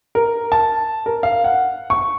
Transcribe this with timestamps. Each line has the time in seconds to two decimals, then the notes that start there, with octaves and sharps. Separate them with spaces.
0.15 A#4
0.52 A5
1.06 A#4
1.23 F5
1.44 F#5
1.90 C#6